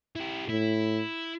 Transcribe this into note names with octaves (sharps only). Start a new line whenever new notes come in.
E4 G4
A2 E4